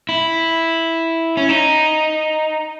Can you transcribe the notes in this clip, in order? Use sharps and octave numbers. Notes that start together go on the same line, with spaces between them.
E4
C#4
D#4